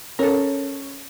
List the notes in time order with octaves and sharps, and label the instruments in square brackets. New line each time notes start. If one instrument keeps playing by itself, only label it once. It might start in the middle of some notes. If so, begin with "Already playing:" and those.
[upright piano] C#4 [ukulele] A4 A#4